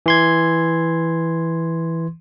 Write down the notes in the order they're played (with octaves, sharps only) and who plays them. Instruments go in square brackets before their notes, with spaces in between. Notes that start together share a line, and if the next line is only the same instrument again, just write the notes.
[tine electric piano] E3 C6 G#6